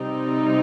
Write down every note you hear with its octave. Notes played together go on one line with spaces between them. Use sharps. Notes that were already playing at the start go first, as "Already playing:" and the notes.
Already playing: C3 G3 C4 D#4